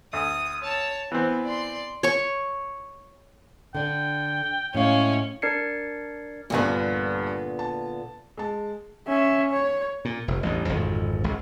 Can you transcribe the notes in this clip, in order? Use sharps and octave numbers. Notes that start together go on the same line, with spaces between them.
D2 D#6
C#5 A5
E3 B3 C4
D5 C6
C#5 C#6
D3 D4 G5
A2 G#3 C#4 F5
D4 A#4 D5 G#6 C7 C#7
A#1 G2 A#2 D3 B3
A5
G#3 A5
C#4 E5
C#5
A#2
F1
A1 E2 G2
G#1 F2 A#2 D3
G#1 C#2